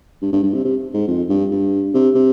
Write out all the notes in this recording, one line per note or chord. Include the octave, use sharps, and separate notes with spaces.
G2
G2
G2
C3
C3
G#2
F2
G2
G2
C3
C3